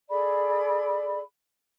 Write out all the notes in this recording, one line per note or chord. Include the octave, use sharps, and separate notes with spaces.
G#4 A4 D5 B5